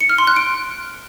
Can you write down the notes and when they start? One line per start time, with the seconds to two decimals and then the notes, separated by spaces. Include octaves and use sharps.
0.01 C#7
0.09 F6
0.18 C6
0.27 F#6
0.36 D7